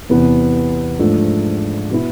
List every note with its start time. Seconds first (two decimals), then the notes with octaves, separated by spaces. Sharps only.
0.09 E2 C3 E3 B3
0.99 G#2 F3 A3 D4
1.91 B2 B3 E4